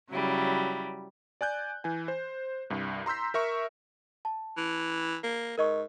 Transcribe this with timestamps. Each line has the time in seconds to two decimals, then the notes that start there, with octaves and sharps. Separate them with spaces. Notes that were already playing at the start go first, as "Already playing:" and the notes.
0.11 C#3 F#3 G3 E4
1.41 D5 G#5 F#6 G6
1.84 E3 G#5
2.08 C5
2.70 C2 G2
3.06 A#5 C6 E6 G6 B6
3.34 A#4 E5 C#6
4.25 A5
4.57 E3
5.24 A#3
5.58 G#2 A#4 D#5 C#6